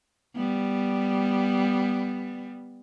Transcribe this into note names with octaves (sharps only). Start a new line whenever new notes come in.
G3 B3